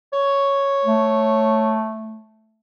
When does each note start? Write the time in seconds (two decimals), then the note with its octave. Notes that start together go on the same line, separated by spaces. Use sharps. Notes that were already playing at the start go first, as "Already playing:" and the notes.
0.13 C#5
0.85 A3